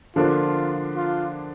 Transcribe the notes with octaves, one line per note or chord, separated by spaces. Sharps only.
D3 F3 A#3 D4 F4
F4